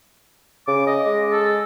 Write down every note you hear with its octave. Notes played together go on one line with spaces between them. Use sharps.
C#3 D6
D#5
G#3
A4